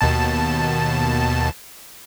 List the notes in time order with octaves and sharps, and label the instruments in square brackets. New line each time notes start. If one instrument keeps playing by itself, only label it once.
[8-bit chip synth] D#2 B2 A5